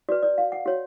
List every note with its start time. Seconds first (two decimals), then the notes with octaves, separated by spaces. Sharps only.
0.09 F#4 D5
0.12 B4
0.23 D5
0.38 F5
0.52 F#5
0.66 F#4 C#5